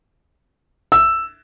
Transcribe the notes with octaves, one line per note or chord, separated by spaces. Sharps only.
E6